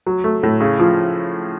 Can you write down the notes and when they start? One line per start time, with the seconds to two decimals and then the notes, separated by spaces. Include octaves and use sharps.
0.07 F#3
0.24 A3
0.43 A2
0.61 C#3
0.79 F3